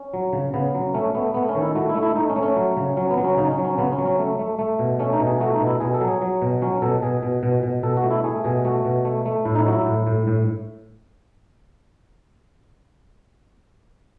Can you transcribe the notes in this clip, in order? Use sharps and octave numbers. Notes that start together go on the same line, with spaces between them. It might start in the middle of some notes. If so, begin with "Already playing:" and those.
Already playing: C#4
F#3
C#3
C#3 B3
F#3
A3 C#4
A3 B3
A3 B3
C#4
D#3
E4
A3 F#4
E4
A3
E4
A3 D#4
C#4
A3
C#4
F#3
C#3
F#3 C#4
B3
F#3
C#4
C#3 D#4
C#4
F#3
C#4
C#3 B3
C#4
F#3
C#4
A3
A3
A3
B2
A3 C#4
D#4
B2
G#4
A3 F#4
D#4
B2
E4
B2 G#4
A4
F#3
G#4
F#3
B2
F#3 C#4
B2 A4
B2 G#4
B2
B2
B2
B2 A4
F#4
A3
E4
A3 G#4
B2 G#4
A3 F#4
B2
A3
A3
A2 E4
D#4
E4
F#3 F#4
E4
A2
A2
A2